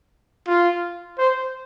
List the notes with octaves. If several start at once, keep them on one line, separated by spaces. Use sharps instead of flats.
F4
C5